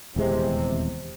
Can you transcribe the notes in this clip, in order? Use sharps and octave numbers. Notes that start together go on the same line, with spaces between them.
D#1 E2 C3 G#3